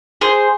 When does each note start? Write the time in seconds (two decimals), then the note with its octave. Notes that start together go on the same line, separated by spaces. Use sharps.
0.21 G#4 C5